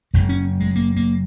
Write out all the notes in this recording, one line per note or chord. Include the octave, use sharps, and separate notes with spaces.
F#1 F#2 C#3 G#3
C#4
G#3
A#3
A#3